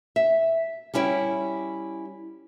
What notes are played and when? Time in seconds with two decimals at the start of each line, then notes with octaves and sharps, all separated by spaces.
0.16 E5
0.94 G3 C#4 E4 C#5 G5